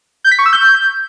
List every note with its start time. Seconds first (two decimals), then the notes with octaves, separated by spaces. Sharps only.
0.24 G6
0.32 B6
0.39 C#6
0.46 E6
0.53 G6